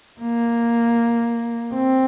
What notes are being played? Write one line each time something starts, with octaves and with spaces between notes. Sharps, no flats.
A#3
C4